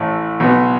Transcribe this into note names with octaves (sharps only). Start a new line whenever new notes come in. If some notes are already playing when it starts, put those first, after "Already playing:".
Already playing: A1 A2 A3
B1 B2 B3